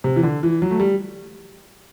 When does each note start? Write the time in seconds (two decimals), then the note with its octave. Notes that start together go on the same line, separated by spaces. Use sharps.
0.04 C3
0.16 E3
0.23 D3
0.43 E3
0.62 F#3
0.71 A3
0.80 G3